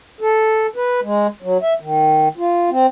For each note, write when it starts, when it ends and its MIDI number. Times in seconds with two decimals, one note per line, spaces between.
0.21 0.67 69
0.76 1.00 71
1.03 1.27 56
1.42 1.58 54
1.62 1.74 76
1.80 2.28 51
2.37 2.70 65
2.70 2.86 60